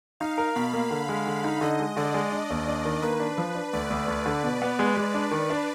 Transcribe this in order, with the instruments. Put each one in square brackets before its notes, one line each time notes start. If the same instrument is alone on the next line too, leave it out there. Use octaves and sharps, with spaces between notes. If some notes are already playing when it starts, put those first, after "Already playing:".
[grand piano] D#4 [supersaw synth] F5
[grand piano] A#4
[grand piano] B2 [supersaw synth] B5
[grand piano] A#3
D3
G#3
D3
D#4
[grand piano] D3 [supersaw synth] D#5
[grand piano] G#3
[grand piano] D3 [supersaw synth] D5
[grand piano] G#3
D4
D#2
D4
D#3
[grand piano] A#3 [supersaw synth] B4
[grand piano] D4
F3
D4
[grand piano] D2 [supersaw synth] D5
[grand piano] D2
D2
D3
B2
B3
G#3
G#3
D4
D#3
D4